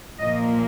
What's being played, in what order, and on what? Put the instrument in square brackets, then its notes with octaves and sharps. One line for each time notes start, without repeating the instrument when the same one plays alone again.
[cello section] A#2 F3 A#3 D#5